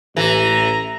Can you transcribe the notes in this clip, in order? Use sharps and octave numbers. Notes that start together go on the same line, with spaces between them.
A1 E3 A#5